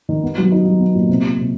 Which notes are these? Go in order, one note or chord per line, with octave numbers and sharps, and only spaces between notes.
D#3
B3
F#3
D#4
F#3
B3
A#2
C3
C3
C3